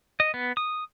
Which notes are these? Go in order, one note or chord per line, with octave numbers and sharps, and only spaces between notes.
D#5
B3
D#6